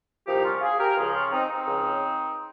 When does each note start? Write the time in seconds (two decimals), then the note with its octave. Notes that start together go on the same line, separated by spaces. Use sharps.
0.26 C2 A#2 F3 D#4 G4
0.44 C#4 F4
0.61 F4 G#4
0.79 G4 A#4
0.97 C#2 C#3 F3 F4 G#4
1.14 C#4 F4
1.32 C4 D#4
1.49 C4 D#4
1.67 C#2 C#3 F3